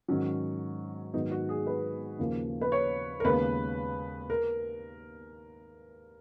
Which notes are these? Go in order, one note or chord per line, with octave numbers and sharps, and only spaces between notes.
G#2 D#3 F#3 C#4
G#2 D#3 F#3 B3 D#4
F#4
G#4
B4
D#2 C#3 F3 A#3
B4
C#5
A#4
D#2 C#3 G#3 B3 B4
A#4